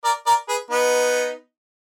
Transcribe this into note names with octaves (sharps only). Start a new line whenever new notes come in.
A#4 D5
A#4 D5
G#4 B4
B3 D#4